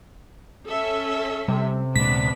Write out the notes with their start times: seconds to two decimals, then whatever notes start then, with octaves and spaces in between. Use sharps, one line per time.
0.67 C#4 A4 E5
1.48 C3 G3
1.96 D2 A#2 G#3 B3 D4 B6